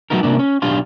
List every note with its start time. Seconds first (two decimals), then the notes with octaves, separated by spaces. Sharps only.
0.10 F#3 G3 A3 B3 D#4 A#4
0.23 C3 A#3 D4
0.39 C#4
0.62 B1 D4 G4 F5 C6